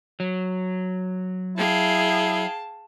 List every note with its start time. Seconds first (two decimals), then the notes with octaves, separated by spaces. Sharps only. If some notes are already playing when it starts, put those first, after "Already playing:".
0.20 F#3
1.57 E4 G#4 F5 G5 A5